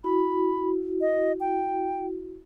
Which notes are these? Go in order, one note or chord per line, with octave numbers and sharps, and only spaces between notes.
E4 F#4 B5
D#5
G5